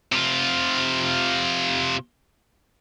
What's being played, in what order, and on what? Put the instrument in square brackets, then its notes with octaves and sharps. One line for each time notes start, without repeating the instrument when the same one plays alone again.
[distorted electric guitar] C3 F4